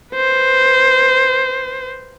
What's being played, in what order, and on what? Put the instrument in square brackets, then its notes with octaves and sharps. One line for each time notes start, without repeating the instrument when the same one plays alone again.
[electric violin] B4 C5